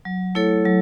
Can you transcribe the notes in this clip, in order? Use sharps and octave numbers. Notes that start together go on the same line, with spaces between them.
F#3
A3 E4 A4 C#5
F#3